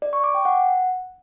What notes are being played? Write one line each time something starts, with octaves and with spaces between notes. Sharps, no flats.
D5
C#6
D6
G5
F#5